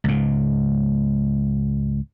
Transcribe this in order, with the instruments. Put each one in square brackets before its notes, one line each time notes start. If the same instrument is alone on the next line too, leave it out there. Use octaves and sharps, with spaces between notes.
[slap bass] C#2 G#2